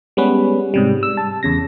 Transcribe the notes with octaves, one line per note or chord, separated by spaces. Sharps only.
G3 G#3 B3 C#4 B4
G#2 C3 G3
E6
A5
E2 C#3 A#6